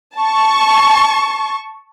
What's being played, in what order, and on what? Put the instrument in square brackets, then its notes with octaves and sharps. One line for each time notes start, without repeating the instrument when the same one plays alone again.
[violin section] A5 C#6